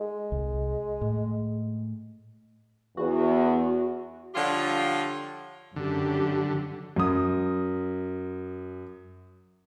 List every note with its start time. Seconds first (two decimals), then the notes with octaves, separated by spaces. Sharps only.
0.01 G#3
0.32 C2
1.01 A2
2.97 E2 F#4
4.34 D3 F3 G3 F4 G4 C#5
5.76 F#2 D3 F#3 G4
6.96 F#2 D#6